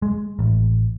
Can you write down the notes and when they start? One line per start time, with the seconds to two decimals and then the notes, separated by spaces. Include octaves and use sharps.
0.02 G#3
0.39 A1